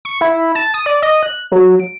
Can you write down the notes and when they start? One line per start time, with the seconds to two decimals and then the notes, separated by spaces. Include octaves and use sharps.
0.05 C#6
0.21 E4
0.55 A5
0.74 D#6
0.86 D5
1.02 D#5
1.23 F#6
1.52 F#3
1.79 D7